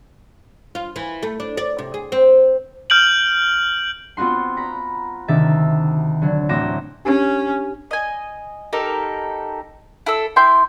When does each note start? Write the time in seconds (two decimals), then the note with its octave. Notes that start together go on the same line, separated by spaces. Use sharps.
0.75 F4
0.96 E3
1.23 A3
1.40 D4
1.57 D5
1.79 C3
1.94 G#4
2.12 C4
2.90 F6 G6 D7 F#7
4.17 B3 C4 F4 F#4 C6
4.57 A#5 B5
5.28 D2 C3 D#3 E5 A6
6.21 D3 F#3
6.49 A1 C4 F#4 D6 A#6 E7
7.05 C#4 D4 G4 G#5
7.91 D#5 G#5
8.73 D#4 G4 A4 A#4
10.06 E4 A4 E6
10.36 E4 G5 C6 G6